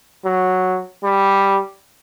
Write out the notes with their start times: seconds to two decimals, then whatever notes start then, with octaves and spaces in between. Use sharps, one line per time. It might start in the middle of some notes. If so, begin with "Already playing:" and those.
0.25 F#3
1.04 G3